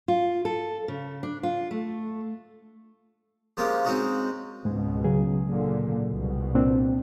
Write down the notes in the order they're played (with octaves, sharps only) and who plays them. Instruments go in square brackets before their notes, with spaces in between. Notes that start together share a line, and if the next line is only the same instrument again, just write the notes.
[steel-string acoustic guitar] F4
A4
C#3
D4
F4
A3
[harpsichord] F3 G#3 A#3 C#4 F4 G4
G#3 C4 C#4 D#4 F#4
[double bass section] C#2 B2 [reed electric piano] G#2 G#3
[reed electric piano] C#3 F#3 G#4
[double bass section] A#2 D3
C2 B2
[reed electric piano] A#2 C4 D4